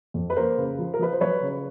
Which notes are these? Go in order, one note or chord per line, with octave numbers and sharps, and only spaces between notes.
F2
B4
A#3 A#4 C5
C#3
F3
A#4
F3 B4
C5
F#3 B4 C#5
C#3